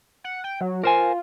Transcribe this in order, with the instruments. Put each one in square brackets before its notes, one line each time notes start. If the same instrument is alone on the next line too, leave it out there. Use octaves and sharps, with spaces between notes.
[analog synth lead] F#5
G5
F#3
[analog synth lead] F4 [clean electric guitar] A#4 C5 G#5